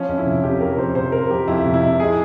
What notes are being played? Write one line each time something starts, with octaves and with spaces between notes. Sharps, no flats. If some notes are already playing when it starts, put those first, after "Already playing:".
Already playing: F3 C#4
F2
E4
C3
F2 G4
F3 A#4
F2 C5
C3 C5
F2 A#4
F3 G4
F2 E4
C3
E4
F2
G#3 G#4